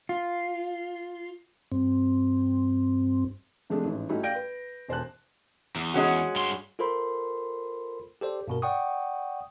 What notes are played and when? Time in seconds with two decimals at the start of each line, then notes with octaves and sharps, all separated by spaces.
0.09 F4
1.72 G2 C4
3.70 C3 F3 G#3 A3 D4
3.85 A1 G#2
4.09 G3 A3 C#4 D#4 E4 F#4
4.23 D5 F5 G5 G6 A#6 D7
4.35 B4
4.88 E1 C5 A5 F#6
5.76 E2
5.94 G#3 C#4 F#4
6.36 G2 C6
6.79 F4 A4 A#4 C5 B5 C6
8.21 G4 A4 C5 D5
8.48 G2 B2 A#4
8.62 D5 F#5 G5 C#6 D#6